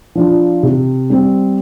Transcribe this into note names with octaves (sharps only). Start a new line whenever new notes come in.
F3 D4 F4
C3
G3 C4